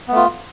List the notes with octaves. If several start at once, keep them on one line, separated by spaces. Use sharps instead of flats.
A3 B3 F4